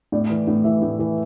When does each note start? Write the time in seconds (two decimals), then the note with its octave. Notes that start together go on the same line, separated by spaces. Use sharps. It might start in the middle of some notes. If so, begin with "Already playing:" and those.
0.12 A2 D5
0.30 E3
0.47 A2
0.64 E3 E5
0.82 A2
0.99 E3